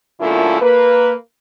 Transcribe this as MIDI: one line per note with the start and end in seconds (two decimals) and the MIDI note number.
0.21 0.61 42
0.21 0.61 46
0.21 0.61 50
0.21 0.61 57
0.21 0.61 64
0.21 0.61 65
0.61 1.13 58
0.61 1.13 71